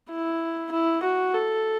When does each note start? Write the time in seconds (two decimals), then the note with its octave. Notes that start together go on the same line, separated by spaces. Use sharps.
0.10 E4
0.72 E4
1.03 F#4
1.34 A4